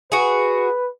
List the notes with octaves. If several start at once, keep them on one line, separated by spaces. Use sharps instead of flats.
F#4 G#4 B4